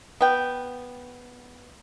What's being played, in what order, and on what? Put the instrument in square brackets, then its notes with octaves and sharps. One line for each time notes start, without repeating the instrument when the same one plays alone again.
[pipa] B3 G5